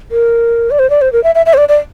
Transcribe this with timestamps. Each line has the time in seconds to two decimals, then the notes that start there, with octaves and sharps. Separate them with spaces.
0.11 A#4
0.71 D5
0.79 C5
0.90 D5
1.01 C5
1.13 A#4
1.24 E5
1.35 E5
1.46 E5
1.54 C5
1.57 D5
1.69 D5